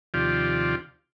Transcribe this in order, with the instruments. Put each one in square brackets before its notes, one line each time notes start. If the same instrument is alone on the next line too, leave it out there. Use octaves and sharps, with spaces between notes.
[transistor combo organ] D#2 C3 F3 F4 G4 D5